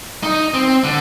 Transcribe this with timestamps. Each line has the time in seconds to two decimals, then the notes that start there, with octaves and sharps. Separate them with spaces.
0.23 D#4
0.54 C4
0.84 D3